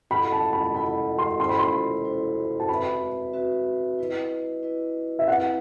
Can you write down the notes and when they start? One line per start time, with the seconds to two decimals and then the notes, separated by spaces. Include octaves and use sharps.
0.10 E4 A4 D#5 F#5 B5
0.32 A5
0.53 B5
0.75 E4 A4 D#5 F#5 B5
1.19 C6
1.40 E4 A4 C5 C6
1.49 B5
1.59 C6
2.05 E4 A4 C5
2.60 A5
2.69 C4 F#4 B4 E5 B5
3.33 C4 F#4 B4 E5
3.99 E4 B4 D#5
4.63 E4 B4 D#5
5.19 E5
5.28 C4 E4 B4 F#5